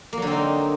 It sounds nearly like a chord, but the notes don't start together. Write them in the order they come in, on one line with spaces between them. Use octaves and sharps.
A#3 F#3 D3 C4 D#4